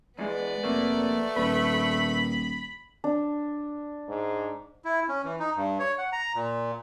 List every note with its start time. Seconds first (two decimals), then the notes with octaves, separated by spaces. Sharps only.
0.19 E2 G#3 B3 D5
0.64 F1 A3 A#3
1.36 D#1 A#2 B4 B5
3.04 D4
4.08 G#2
4.85 E4
5.09 C#4
5.24 E3
5.39 D#4
5.56 G2
5.79 C#5
5.98 F#5
6.12 A#5
6.35 A#2